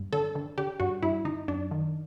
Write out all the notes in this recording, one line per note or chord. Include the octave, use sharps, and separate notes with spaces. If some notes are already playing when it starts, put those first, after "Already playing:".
Already playing: G2
D3 A4
D3
D3 G4
G2 F#4
G2 E4
D3 D#4
F#2 D4
D#3